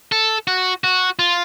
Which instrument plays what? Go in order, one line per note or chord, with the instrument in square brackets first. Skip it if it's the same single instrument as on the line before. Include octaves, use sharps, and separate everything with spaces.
[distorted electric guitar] A4
F#4
F#4
F4